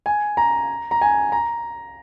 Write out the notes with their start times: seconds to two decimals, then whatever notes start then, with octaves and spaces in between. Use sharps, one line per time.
0.06 G#5
0.37 A#5
0.91 A#5
1.01 G#5
1.32 A#5